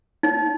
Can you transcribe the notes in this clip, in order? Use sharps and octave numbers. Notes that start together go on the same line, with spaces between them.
D#4